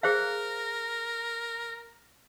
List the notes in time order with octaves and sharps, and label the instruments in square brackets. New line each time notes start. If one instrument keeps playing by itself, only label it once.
[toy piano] G#4 C5 F5 [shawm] A#4